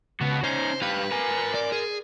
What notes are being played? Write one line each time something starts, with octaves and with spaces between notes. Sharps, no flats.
C#2 B3 F#4
C#4 D#4 C5
G2 G4 B4 F5
A#4 G#5
D5
G#4